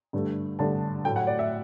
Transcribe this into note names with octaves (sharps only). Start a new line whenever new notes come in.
G2 D3 A3
G2 D3 A3 A5
A2 F#3 A3 G5
F#5
D5
E5